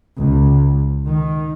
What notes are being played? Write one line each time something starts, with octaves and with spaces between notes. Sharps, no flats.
C#2
D#3